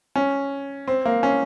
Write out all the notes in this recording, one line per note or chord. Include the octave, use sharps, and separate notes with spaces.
C#4
C4
A#3
C#4